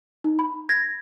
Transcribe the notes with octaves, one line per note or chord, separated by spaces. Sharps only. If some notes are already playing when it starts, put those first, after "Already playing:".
D#4
B5
G#6 A#6